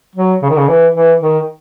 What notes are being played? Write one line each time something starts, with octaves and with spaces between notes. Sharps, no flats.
F#3
C#3
D#3
C#3
E3
E3
D#3